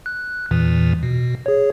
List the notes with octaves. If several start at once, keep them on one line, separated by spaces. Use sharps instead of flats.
F#6
E2 A#2 E3
B2
G#4 C#5